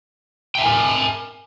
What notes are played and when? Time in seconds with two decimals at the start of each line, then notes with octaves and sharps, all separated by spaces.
0.55 G5
0.58 E5
0.62 G#5
0.65 A#4